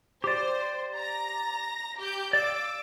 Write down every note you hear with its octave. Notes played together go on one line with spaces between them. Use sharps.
G4 C5 D5
A#5 A#6
G4 G6
D5 F5 D6 E6